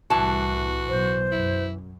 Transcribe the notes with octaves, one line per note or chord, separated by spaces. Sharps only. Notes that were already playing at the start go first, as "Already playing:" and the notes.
C2 A2 E3 F#4 A5
B1 C5
F#2 E4